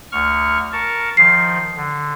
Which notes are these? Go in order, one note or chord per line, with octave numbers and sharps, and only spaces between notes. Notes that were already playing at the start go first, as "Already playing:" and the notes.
D2 C#6 F6
A#4 A5 C#6
D#3 F3 C7
D3